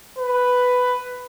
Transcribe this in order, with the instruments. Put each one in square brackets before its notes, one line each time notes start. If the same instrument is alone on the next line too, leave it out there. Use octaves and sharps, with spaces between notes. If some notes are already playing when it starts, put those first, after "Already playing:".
[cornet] B4